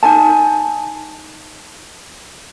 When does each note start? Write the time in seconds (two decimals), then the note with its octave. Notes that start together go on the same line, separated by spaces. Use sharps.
0.03 D#4 G#5 A5